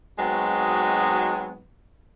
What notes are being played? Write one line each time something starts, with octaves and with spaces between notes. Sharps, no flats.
F#3 G#3 B3 C4 D#4 F#4